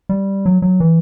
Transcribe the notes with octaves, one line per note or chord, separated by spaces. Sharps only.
G3
F#3
F#3
E3